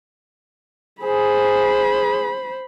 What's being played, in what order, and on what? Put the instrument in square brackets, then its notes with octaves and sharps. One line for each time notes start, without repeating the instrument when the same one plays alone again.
[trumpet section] G#4 [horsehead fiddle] C5 B5